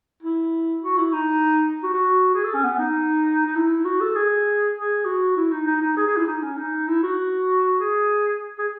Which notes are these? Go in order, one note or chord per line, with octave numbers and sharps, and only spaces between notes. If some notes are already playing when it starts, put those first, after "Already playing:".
E4
F#4
E4
D#4
F#4
F#4
G#4
A4
C#4
B3
D#4
D#4
E4
F#4
A4
G#4
G#4
F#4
E4
D#4
D#4
D#4
G#4
G#4
E4
D#4
C#4
D#4
E4
F#4
G#4
G#4